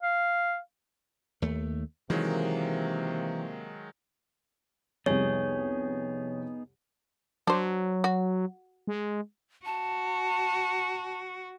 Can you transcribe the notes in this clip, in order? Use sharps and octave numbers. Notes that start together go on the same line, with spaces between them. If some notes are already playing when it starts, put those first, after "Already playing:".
F5
D#2 A3
C3 D#3 E3 F#3 G#3 A#3
C2 F2 G3 B3 D#4 G#4 C#5
F#3 D4 C5
F#4
G#3
F#4 A5